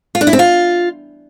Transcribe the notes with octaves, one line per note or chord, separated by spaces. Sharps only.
F4
D4
E4
C4
F4